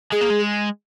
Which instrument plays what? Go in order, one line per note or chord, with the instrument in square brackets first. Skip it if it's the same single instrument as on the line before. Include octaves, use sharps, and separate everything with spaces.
[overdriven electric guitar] G#3 [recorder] G#4
[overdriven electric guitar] A#3
G#3